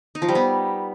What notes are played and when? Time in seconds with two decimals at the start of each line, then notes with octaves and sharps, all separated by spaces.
0.15 D#4
0.22 F3
0.28 G3
0.35 B3